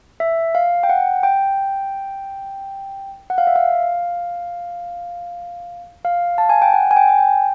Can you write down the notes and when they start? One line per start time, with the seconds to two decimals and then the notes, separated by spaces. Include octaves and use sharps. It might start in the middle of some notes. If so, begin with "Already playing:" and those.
0.20 E5
0.55 F5
0.83 G5
0.89 F#5
1.23 G5
3.30 F#5
3.38 F5
3.47 E5
3.56 F5
6.05 F5
6.38 A5
6.50 G#5
6.62 G5
6.74 F#5
6.91 G#5
6.96 G5
7.08 G#5
7.19 G5